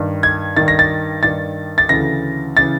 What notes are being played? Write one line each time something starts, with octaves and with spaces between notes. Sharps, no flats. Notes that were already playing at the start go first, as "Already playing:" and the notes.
Already playing: G2 D#3
G#6
G2 D#3 A6
A#6
A6
G2 D#3 A6
A6
D2 C#3 E3 A#6
C#3 E3 A6